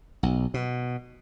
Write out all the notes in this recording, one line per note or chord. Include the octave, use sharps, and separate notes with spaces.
B1
B2